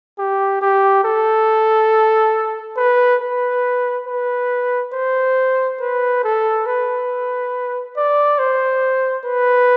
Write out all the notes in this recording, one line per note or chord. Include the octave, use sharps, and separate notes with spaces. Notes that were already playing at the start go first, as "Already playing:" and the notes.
G4
G4
A4
B4
B4
B4
C5
B4
A4
B4
D5
C5
B4